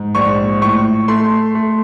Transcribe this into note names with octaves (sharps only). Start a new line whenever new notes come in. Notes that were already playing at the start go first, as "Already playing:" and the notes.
Already playing: G#2
A#1 C#6
A2 C#6
A3 C6
A3